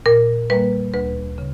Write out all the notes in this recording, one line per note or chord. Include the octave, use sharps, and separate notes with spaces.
A#2 A#4
G3 A#3 B4
D2 B4
C#3